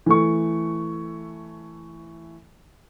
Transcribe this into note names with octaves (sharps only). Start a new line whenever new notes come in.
E3 A3 C#6